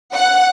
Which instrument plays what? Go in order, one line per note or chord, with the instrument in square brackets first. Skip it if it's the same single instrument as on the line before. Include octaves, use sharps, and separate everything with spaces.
[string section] F#5